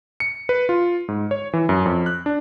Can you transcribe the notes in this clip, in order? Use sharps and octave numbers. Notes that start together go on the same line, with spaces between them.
C#7
B4
F4
G#2
C#5
E3
F#2
F2
F#6
D4